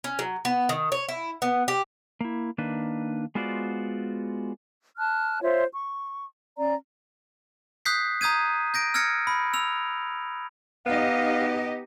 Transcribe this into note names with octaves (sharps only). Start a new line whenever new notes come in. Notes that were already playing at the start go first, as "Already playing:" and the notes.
C#4
F#3
B3
D#3
C#5
E4
B3
G4
A#3 E4
D#3 A#3 D4 B4
G#3 B3 F4 F#4 C5 D5
A5 F6 F#6
F4 C5 C#5 E5
C#6
C#4 D5 A#5
D#6 F#6 G6 B6 C7
A#5 D#6 G6 G#6 D#7
G6 A#6 D7
E6 F6 G#6 A#6 C#7
B5
E6 F7
B3 D#4 G4 D#5 F5